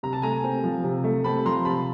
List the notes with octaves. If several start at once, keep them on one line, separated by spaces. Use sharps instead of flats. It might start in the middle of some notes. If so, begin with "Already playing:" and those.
C3 A#5
A5
A3 G#5 A#5
C4
F3
C3
A3
C4 A5 B5
F3 A#5 C6
C3 A5 B5